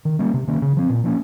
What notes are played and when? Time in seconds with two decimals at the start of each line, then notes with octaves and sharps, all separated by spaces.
0.05 D#3
0.19 G3 A#3 C#4
0.34 C3
0.48 D#3 A#3 C#4
0.62 C#3
0.77 F3 C4
0.89 A#2
1.04 F3 A#3 C#4